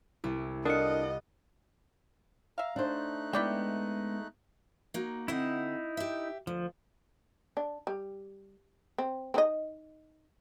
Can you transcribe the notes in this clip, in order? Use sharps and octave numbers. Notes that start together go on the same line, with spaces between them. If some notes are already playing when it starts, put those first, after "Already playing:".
C2 E4
D4 F4 A4 A#4 D#5 F#5 C#7
E5 F5 A#5
A3 D4 D#4 C5 F#6
G#3 B3 E4 D5 G5
A#3 D#4 F#4
D3 C4 D#4 E4 F#5
G4 E5
D2 F3
D4
G3
C4
C4 D#4 D#5